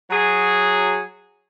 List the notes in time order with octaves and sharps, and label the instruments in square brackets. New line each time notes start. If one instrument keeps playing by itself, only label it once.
[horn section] F#3 G#4